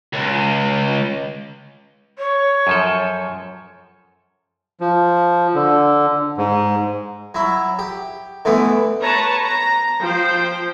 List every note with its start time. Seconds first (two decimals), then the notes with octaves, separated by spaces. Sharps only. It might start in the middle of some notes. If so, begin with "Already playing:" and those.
0.13 C#2
2.18 C#5
2.67 F#2 F3 A4
4.80 F3
5.55 D3
6.38 G#2
7.34 F#3 E4
7.79 G4
8.45 D3 E3 A3 B3
9.02 B4 C#5 A5 A#5
9.44 A#5
10.00 F3 C5 G5